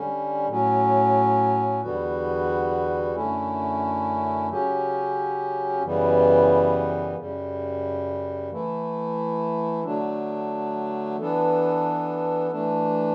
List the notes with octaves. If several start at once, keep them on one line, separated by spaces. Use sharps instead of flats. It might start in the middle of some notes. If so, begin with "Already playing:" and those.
Already playing: D3 G3 C#4
A2 F#3 C#4
E2 D3 G3 B3 F#4
F#2 D3 A3 C#4 E4
C#3 F#3 C#4 G4
F#2 C#3 E3 G3 B3
F#2 C#3 G3
E3 A3 E4
D3 F#3 A3 D4
E3 B3 D4 A4
E3 A3 D4